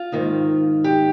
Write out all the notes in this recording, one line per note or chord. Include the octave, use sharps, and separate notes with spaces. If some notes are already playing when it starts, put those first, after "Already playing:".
Already playing: F4
G#2 D#3 A#3 D#4
G4